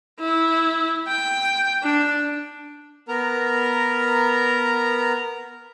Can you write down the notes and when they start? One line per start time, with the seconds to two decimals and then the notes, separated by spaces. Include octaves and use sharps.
0.19 E4
1.08 G5
1.83 D4
3.08 B3 A#4 A#5